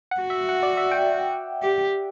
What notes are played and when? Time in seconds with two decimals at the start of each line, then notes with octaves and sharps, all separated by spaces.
0.11 F#5
0.21 F#4
0.30 E5
0.49 F#5
0.63 D5
0.77 E5
0.91 G5
1.63 G4